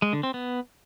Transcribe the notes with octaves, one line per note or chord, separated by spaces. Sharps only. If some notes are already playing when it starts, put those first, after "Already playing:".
G#3
D3
C4
B3